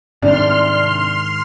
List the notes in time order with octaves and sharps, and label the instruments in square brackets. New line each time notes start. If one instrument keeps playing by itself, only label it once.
[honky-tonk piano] C2 D4 [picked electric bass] G#2 D#3 [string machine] C6 F6